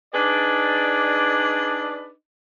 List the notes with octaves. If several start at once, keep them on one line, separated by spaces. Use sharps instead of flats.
D4 D#4 G#4 B4 D5